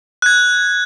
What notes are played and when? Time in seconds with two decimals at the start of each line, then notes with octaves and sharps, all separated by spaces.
0.22 F#6 G#6